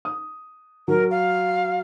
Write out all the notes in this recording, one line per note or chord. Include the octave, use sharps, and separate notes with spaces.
D#6
F#3 A#4
F5